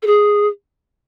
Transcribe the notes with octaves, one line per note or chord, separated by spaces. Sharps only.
A4
G#4